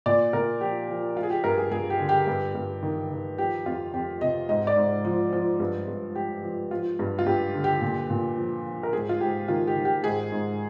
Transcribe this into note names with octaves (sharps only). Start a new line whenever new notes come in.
A#2 D5
A#2 A#4
F3 G4
F3
F3 F4
G#4
G4
G2 A#4
G#4
G2 G#4
G4
D3
G4
G2
G2
D#3
D#3
F3 G4
F2 F4
F2 G4
C3 D#5
G#2 D#5
D5
G#2
F3
F3
G2
G2
F3 G4
F3
F3 F4
G2
F4
G2 G4
D3
G4
A#2
A#2
F3
F3
A#4
G#2 G#4
F4
G#2 G4
D#3 F4
G4
D#3
G4
G#2 G#4
G#2